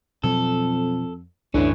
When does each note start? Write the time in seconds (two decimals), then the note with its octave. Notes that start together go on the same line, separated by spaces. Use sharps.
0.24 F2 B2 F#3 A4
1.54 C2 F#2 A2 E3 C#4 D4